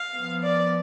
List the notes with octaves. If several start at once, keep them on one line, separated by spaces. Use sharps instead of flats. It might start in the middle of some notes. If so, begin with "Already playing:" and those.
Already playing: F5
F3 B3
D5